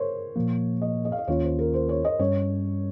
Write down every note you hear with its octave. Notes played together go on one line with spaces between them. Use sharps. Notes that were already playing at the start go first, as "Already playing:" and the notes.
Already playing: A#4 C5 C#5
A#2 F3 A#3
D#5
D#5
F5
D#5
D#2 D#3 A#3 C#4 F4 C#5
C5
A#4
C5
C#5
D#5
G2 G3 C#4 C#5